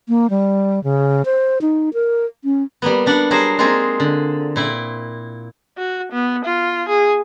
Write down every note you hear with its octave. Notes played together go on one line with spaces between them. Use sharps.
A#3
G3
C#3
C5
D#4
A#4
C#4
G3 A#3 B3
G3 D4 F#5
F#3 G3 G#4 A#4 C5
G#3 A#3 C4 D#4 F4 G#4
D3
A#2 E4 G5
F#4
B3
F4
G#4